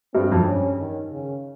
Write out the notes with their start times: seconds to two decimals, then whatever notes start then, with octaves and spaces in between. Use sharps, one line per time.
0.14 G2 C4
0.32 F2
0.35 G2
0.46 C#4
0.79 D#3
1.11 C#3